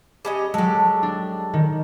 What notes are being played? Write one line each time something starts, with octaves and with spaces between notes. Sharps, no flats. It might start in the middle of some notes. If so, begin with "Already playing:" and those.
G3 C#4 D#5
F#3 G#3 G4 A4
D4
D#3